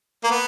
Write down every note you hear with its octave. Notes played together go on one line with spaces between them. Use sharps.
A#3
B3